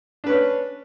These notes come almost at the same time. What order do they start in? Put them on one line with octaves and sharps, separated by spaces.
D4 B4 C#4